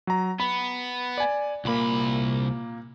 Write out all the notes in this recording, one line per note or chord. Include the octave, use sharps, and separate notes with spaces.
F#3 A#5
B3 B5
D5 G#5
C2 A#2 A#3 B5